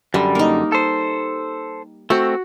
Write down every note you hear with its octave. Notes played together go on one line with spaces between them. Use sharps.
F#2 D3 G3
A#3 D#4
A4 C5
A3 C4 F#4